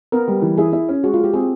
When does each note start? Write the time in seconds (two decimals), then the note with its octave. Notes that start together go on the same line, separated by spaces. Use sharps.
0.12 B3 A#4
0.28 G3
0.42 E3
0.58 E4 G#4
0.73 E4
0.89 C#4
1.04 G#3 F#4
1.14 F4
1.19 G#3
1.24 G4
1.33 C4 G#4